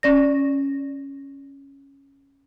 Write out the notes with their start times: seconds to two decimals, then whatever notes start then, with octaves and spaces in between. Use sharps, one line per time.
0.03 C#4 D5 A#6